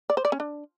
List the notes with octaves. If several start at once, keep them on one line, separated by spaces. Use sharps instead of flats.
D5
C5
D5
C#4
D4